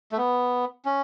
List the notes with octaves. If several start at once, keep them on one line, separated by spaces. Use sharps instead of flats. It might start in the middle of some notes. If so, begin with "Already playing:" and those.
A3
B3
C#4